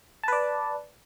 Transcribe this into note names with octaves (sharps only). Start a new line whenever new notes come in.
B4 D5 A5